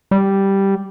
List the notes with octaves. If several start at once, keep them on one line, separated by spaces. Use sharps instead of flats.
G3